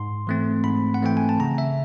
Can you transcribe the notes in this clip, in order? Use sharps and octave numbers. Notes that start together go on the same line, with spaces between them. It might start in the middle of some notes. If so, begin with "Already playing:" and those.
Already playing: G#2 C6
E3 A3 C4
G#2 B5
F#5
E3 A3 C4 G5
G#5
A5
C#3 A#5
E5